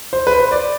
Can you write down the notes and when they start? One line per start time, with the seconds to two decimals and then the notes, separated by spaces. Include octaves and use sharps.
0.13 C5
0.27 B4
0.39 C5
0.52 D5